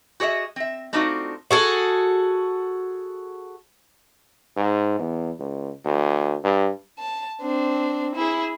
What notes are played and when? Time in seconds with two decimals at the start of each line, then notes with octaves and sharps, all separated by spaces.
0.20 F#4 G#4 C#5 D#5 E5
0.56 C4 E5
0.93 A3 C4 D4 D#4 F4 F#4
1.51 F#4 G#4 A4
4.57 G#2
4.99 E2
5.39 C#2
5.85 D2
6.44 G2
6.99 A5
7.42 C4 D4
8.15 E4 G#4